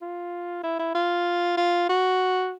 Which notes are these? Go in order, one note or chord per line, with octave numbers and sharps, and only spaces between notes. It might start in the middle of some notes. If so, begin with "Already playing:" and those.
F4
E4
E4
F4
F4
F#4